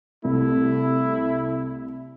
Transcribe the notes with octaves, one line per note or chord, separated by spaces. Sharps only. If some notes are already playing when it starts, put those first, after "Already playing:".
C2 A3 E4